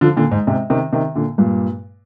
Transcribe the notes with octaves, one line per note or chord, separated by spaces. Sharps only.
D3 F3
A#2 D3
G#2
G#2 C3
C3 D#3
C3 D#3
A#2 D3
G2 A#2